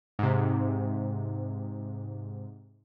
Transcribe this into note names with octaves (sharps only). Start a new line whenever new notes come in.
G#2 C3